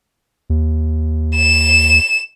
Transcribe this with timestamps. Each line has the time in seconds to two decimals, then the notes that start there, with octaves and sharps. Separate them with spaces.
0.50 D#2
1.36 E7